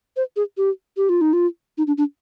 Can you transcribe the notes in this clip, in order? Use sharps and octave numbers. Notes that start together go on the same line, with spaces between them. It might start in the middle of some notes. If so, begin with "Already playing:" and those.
C5
G#4
G4
G4
F4
D#4
F4
D#4
D4
D4